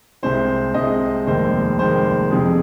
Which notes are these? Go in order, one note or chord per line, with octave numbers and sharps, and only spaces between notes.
C2 C3 G#3 C5
C2 C3 G#3 D#5
F1 D#2 D#3 G#3 C5
F1 D#2 D#3 G#3 C5
F2 C3 F3 G#4